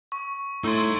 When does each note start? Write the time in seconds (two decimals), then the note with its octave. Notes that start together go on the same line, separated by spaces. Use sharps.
0.12 C#6
0.64 A2 D#4 C6 E6